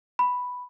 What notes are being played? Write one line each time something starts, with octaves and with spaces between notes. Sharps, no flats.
B5